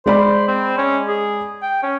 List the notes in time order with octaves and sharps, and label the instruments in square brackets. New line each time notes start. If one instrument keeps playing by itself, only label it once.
[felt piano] G#3 D5 B5 [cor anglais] C5
[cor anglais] C4
C#4
G#4
G5
C#4